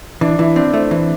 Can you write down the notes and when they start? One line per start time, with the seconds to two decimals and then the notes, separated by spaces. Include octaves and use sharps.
0.21 E3 D4
0.39 E3 E4
0.56 C4 D4
0.74 A3 C4
0.91 E3